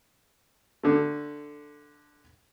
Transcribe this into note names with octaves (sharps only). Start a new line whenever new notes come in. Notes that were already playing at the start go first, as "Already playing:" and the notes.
D3 A3